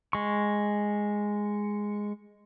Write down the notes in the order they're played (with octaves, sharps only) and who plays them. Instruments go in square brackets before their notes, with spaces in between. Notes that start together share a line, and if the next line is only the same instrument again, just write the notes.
[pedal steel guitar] G#3 C#6